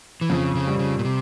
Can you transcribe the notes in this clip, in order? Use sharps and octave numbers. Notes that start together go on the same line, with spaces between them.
E3
F2 C#3
C#3
G3
C#3
A#2
C3